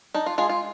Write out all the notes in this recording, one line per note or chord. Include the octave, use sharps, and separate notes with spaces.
D4 D#4
F4
G#3 F4 G#4
F4